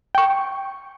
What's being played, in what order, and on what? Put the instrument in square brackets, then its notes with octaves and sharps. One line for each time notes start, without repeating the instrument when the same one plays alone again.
[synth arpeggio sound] G5 C#6